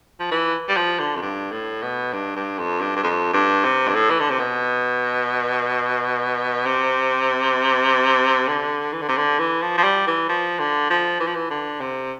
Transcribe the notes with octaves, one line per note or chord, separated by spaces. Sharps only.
F3
E3
G3
F3
D3
F2
G2
A2
B2
G2
G2
F2
G2
G2
F2
G2
C3
G2
A2
E3
D3
C3
B2
C3
D3
E3
D3
C3
D3
E3
F3
F3
G3
E3
F3
D3
F3
E3
F3
E3
D3
C3